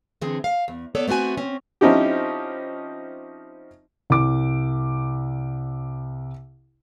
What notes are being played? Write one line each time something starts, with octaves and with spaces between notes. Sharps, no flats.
D3 E3 C4 G#4
F5
E2
B3 A4 C#5 D5
A3 B3 C4 F#4 G#5
C4 C#4
F3 C4 C#4 D#4 E4 G4
C2 D6